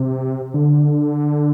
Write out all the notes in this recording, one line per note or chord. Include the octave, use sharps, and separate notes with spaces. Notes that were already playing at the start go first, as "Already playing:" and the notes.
Already playing: C3
D3